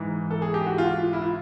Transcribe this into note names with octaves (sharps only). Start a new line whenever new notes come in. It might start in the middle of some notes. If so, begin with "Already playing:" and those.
Already playing: G#2 E3
A4
G#4
G4
F#4
F4
E4
F4